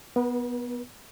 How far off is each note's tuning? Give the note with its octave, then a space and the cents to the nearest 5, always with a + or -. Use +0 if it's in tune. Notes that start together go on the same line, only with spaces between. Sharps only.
B3 -5 B4 -45